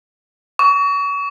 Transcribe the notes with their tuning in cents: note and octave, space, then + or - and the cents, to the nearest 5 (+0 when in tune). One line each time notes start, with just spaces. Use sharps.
C#6 +35